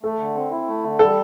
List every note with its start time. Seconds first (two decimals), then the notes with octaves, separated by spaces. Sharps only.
0.03 A3 A4
0.19 D3
0.36 C4
0.51 E4
0.67 A3
0.84 D3
0.99 G3 A4